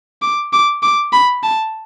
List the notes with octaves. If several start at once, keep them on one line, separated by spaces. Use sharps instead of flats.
D6
D6
D6
B5
A5